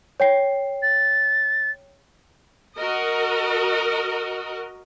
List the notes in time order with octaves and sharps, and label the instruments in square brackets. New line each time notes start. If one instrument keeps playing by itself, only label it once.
[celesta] C#5 G5 C7
[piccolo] A6
[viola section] F#4 A#4 D#5